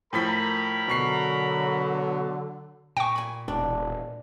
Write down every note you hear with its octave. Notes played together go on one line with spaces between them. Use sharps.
A2 F3 A#4 A#5 B5 B6
B2 D3 F#3 C#6 C7
A#2 G5 A#5 C#6
G#5 B5
E1 D4